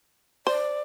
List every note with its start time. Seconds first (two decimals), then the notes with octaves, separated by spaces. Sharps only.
0.47 C5 D5